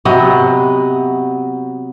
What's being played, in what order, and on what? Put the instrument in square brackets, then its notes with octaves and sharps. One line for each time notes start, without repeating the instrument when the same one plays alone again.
[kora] C3 F#3 B3 D#5